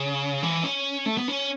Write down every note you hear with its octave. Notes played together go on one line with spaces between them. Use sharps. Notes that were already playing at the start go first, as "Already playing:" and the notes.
Already playing: C#3
E3
C#4
A3
B3
C#4